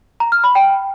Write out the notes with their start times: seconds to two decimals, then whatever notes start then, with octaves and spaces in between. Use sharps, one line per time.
0.20 A#5
0.32 F6
0.44 B5
0.55 G5